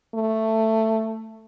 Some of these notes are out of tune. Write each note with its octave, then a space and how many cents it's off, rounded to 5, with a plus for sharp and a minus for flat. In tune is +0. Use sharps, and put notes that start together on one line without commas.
A3 +10